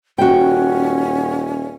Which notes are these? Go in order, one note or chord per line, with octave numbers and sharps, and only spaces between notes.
D#1 C#4 F#4 G5